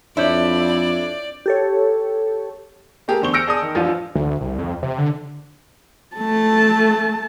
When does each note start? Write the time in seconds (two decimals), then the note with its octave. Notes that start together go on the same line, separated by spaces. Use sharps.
0.17 F2 D4 E4 C#5 D5 G6
1.46 G4 A4 C#5
3.08 A3 G4 G#4 A#4
3.22 E2 D3 C5 C#6 G7
3.33 E6 F6 G6 A#6 C#7 D7
3.47 G#4 D5 A5 D#6
3.62 D#3
3.75 A1 F3 D4 F4 D#7
4.15 D2
4.41 C2
4.58 F2
4.83 C3
4.98 D3
6.16 A3 A5